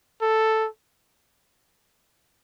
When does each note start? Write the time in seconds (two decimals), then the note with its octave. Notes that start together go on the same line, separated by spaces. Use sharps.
0.21 A4